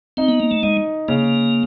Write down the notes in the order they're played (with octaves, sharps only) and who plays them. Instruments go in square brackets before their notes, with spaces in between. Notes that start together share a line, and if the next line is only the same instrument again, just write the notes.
[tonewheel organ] C4 [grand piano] D#4
[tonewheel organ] B3
A#3
A3
[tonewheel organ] G#3 [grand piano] D#4
[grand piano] C#3 [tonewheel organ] A#3